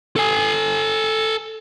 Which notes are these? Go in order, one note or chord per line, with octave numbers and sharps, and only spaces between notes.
A4 G#5